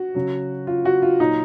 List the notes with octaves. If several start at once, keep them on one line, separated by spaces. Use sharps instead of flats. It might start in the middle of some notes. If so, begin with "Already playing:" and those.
Already playing: F#4
C#3 F#3
F4
F#4
F4
A#2 F#3 D#4